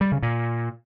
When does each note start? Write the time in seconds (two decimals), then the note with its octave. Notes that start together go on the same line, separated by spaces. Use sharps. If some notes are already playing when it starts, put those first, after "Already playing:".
0.01 G3
0.12 C#3
0.23 A#2